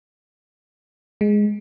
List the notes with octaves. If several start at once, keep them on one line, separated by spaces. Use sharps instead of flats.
G#3